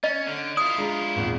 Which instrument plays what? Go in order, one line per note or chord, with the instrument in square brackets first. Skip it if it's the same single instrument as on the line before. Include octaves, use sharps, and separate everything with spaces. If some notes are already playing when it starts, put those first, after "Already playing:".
[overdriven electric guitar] C#4 [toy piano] D#5
[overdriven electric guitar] D3
[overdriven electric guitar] E4 F4 [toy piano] D#6
[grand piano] G#3 D4 A#5
G#1 E2 A#2